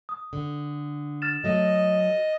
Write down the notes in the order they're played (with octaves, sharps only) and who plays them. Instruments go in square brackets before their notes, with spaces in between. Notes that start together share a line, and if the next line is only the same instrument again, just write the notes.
[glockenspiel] D#6
[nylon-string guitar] D3
[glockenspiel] F6 A6 E7
[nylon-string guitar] F#3 A3 [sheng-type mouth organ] D#5